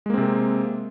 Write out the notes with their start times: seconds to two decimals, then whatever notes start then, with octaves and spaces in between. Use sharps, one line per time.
0.06 G#3
0.10 A#3
0.14 C4
0.18 C3